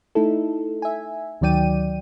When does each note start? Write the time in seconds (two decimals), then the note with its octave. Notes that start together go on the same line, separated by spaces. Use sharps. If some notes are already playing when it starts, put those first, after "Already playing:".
0.15 A3 D#4 E4 A4
0.82 E5 G#5
1.41 D2 D#3 F#3 D5 G5 D#7